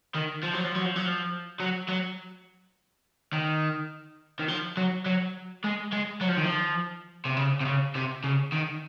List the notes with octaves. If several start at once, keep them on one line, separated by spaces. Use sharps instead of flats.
D#3
F3
F#3
F3
F#3
F3
F#3
F3
F#3
F#3
D#3
D#3
F3
F#3
F#3
G#3
G#3
F#3
F3
D#3
F3
C3
C#3
C3
C#3
C3
C#3
D#3